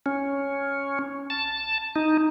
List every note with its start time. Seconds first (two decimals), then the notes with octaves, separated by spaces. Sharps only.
0.06 C#4
1.30 A5
1.96 D#4